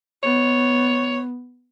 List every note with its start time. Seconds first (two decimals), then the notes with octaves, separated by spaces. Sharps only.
0.23 B3 C#5